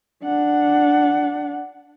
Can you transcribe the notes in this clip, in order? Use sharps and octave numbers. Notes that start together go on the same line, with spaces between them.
D4 F#5